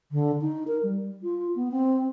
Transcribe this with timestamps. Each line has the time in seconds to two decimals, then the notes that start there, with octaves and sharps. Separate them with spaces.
0.12 D3
0.41 D#4
0.67 A#4
0.83 G3
1.23 F4
1.56 B3
1.71 C4